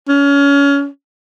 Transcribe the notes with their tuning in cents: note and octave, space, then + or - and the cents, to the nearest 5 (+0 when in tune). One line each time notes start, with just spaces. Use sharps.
C#4 +25